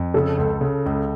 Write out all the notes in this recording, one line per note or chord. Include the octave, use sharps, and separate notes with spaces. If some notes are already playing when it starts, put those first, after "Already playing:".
Already playing: F2
C#3 A4
C#2
C#3
C#2